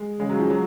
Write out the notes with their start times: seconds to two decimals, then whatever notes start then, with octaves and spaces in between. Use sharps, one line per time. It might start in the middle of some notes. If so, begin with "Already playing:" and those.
Already playing: G#3
0.20 C#3 G#3
0.29 F#3
0.39 F3
0.50 F#3